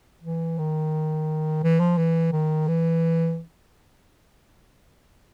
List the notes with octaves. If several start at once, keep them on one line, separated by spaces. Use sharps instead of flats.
E3
D#3
E3
F3
E3
D#3
E3